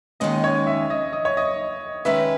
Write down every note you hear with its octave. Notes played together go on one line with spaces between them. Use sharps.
D#2 D#3 G#3 C#4 D#5
C#5
E5
D#5
D#5
C#5
D#5
D#3 G#3 C#4 G#4 B4 E5